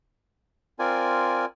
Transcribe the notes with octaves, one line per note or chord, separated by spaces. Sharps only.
C4 F4 A#4 D5 G#5